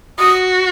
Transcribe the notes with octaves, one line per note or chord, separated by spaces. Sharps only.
F#4 D#6